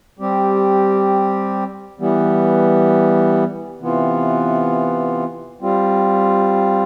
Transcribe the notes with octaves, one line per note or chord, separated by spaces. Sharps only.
G3 C4 G4
E3 G3 B3
C3 E3 B3 F4
G3 C4 F4